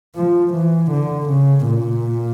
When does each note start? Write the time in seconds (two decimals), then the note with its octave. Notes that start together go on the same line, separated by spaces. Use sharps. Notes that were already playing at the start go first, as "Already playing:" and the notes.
0.16 F3
0.54 E3
0.91 D3
1.29 C#3
1.68 A#2